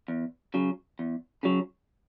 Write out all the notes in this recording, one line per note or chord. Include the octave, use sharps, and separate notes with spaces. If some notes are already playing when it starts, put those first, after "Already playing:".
E2
C#3 F#3
E2
C#3 F#3